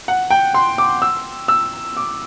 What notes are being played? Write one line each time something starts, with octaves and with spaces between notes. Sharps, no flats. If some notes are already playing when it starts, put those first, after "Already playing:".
F#5
G5
C6
D6
E6
E6
D6